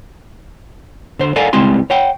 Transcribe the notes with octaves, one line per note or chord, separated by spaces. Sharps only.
D3 C5
A4 A#4 D5 F5 F#5 G#5
C#2 G3 G#3 C4 E4 C6
C#5 F#5 G5